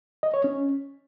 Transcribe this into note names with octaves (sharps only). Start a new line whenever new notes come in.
D#5
C#5
C#4